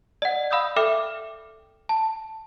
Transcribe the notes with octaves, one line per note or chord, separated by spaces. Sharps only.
D5 D#5 F#5
F5 B5 D#6 E6 G6
A4 E5 G5 D6 F6
A5